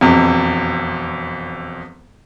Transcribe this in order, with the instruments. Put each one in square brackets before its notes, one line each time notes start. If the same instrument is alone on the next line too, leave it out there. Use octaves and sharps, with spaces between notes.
[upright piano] E1 F2